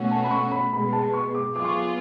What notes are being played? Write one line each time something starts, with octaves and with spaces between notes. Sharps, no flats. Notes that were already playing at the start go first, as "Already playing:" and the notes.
Already playing: B2 A3 C#4 F#4
A5
B5
C#6
B5
B2 G#3 B3 B5
A5
C#6
D6
F#3 B3 F4 G#4 D6
C#6
D6